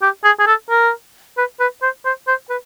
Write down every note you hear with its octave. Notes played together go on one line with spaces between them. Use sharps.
G4
G#4
G#4
A4
A#4
B4
B4
C5
C5
C5
B4